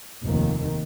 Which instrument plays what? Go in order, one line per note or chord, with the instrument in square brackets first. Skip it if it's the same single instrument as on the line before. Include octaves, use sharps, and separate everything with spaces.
[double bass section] F1 D#2 D#3